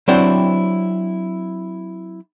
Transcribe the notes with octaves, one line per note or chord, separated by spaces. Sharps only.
F#3 C4 D4 E4 G4 C5